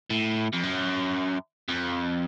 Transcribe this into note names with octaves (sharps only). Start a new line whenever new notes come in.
A2
F2
F#2
F2